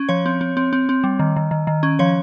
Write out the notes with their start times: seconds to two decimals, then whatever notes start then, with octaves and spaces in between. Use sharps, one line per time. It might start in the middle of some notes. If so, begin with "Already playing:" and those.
Already playing: C#4
0.09 F3 C#5
0.26 C4
0.41 C4
0.57 C4
0.73 C4
0.89 C4
1.04 G3
1.19 D#3
1.36 D#3
1.51 D#3
1.67 D#3
1.83 C#4
1.99 F3 C#5